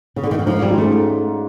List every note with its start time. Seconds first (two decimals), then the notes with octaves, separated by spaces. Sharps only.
0.16 C#3
0.23 D3
0.31 D#3
0.39 E3
0.46 G#2 F3
0.62 G3
0.70 D#3 G#3 C#4 F4
0.78 A3